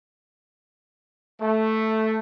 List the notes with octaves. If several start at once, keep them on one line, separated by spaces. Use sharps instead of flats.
A3